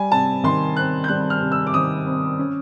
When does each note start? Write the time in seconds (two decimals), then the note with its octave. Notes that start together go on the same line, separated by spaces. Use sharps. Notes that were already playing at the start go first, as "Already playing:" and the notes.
Already playing: G3 G#5
0.12 C3 A5
0.44 D#3 C6
0.77 C4 F#6
1.04 G6
1.08 G3 F#6
1.30 F6
1.41 C3
1.52 E6
1.67 D6
1.74 D#3 D#6
2.07 C4
2.39 C#4